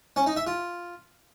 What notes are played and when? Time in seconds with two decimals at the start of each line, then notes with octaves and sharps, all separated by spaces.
0.16 C#4
0.26 D#4
0.37 E5
0.47 F4